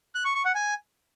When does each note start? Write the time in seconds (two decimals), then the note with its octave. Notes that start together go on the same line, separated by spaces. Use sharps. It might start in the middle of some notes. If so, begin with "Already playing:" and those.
0.15 F#6
0.25 C#6
0.35 C#6
0.45 F#5
0.55 G#5